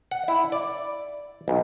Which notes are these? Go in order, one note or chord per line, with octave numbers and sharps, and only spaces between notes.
F#5
E4
D5
B1